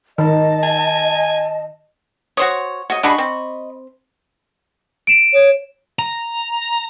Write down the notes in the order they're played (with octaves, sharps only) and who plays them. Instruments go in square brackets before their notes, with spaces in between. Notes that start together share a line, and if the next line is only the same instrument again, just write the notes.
[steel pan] D#3 [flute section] D#5 [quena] A5
[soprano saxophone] G#5
[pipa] F#4 C5 C#5 [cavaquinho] D#6
[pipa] F#4 [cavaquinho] C#5 D#5
[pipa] D4 F#4 G#4 [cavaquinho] D#5 B5 C#6
[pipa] C4
[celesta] D7 E7
[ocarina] C#5
[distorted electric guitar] A#5